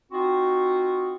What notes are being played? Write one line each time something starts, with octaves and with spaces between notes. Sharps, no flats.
C4 D#4 F4 F#4